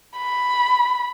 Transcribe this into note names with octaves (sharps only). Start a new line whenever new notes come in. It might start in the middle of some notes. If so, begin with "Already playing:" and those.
B5